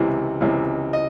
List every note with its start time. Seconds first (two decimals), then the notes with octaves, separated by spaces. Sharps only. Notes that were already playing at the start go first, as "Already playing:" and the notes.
Already playing: C#2 C3 E3
0.41 C#2 C3 E3
0.93 D#5